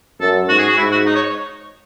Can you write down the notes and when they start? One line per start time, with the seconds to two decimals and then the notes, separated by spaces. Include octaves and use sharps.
0.20 F#2 A4
0.49 G#2 F#4
0.58 G#4
0.68 F#4
0.77 G#2 E4
0.91 F#4
1.06 D#4
1.15 C#5